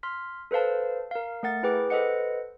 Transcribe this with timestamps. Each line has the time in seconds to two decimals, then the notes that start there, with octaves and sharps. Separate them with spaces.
0.03 C6 F6 B6
0.51 A4 B4 C5 F5 A5
1.11 A#4 F5
1.43 A3 A#4 F#5 A6
1.63 E4 G#4 B4 G5 D6
1.90 A4 B4 C5 D#5 F#5 C#7